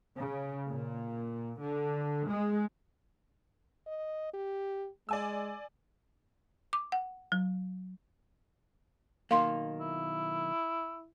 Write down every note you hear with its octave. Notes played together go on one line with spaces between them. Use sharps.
C#3
A#2
D3
G#3
D#5
G4
G#3 D5 G#5 E6
D6
F#5
F#3
B1 D#3 A#3 F5 C6
E4